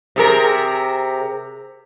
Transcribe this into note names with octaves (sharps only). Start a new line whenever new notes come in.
C3 G#4 A#4